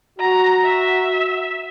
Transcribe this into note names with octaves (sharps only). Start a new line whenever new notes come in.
F#4 A#5
E5